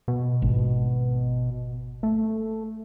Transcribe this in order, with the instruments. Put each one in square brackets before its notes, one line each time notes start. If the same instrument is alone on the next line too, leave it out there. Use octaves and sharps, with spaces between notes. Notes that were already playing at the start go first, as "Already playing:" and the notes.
[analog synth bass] B2
[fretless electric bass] G#1
[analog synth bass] A3